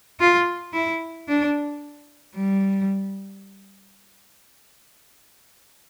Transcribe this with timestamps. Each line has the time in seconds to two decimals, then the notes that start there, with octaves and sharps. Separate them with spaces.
0.20 F4
0.73 E4
1.28 D4
2.35 G3